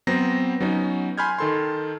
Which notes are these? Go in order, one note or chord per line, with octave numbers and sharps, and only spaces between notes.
F#3 B3 C4 C5 A#5 A#6
F#3 B3 C#4 D#4
G#5 B5 C6 F6 G6 G#6
D#3 A4 C6